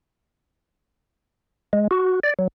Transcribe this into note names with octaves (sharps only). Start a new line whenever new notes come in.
G#3
F#4
D5
F#3